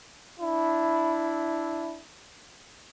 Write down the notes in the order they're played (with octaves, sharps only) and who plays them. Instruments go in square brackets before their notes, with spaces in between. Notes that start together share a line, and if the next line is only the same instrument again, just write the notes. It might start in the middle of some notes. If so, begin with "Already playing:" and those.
[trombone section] D4 E4